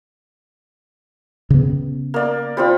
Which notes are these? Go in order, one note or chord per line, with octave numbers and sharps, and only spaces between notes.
C#3 B3
A#3 D5
G3 C4 F4